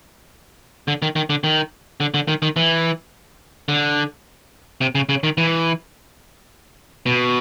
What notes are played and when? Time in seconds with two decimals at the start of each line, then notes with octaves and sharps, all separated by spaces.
0.88 D3
1.02 D#3
1.16 D#3
1.30 D3
1.44 D#3
2.00 D3
2.14 D3
2.28 D#3
2.42 D#3
2.56 E3
3.69 D3
4.81 C3
4.95 C#3
5.09 C#3
5.24 D#3
5.38 E3
7.06 B2